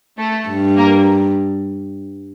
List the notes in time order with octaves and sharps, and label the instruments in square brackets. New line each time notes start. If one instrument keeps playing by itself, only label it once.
[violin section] A3 A4
[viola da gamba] G2
[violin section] A#3 A#4